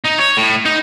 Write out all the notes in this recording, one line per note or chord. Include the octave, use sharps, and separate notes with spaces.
D#4
C#5
A2
D#4